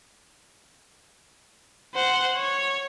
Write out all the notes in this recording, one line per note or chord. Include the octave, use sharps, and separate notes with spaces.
C5 F#5
C#5